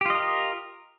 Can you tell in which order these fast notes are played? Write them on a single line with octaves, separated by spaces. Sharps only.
G4 F4 D#5 A#4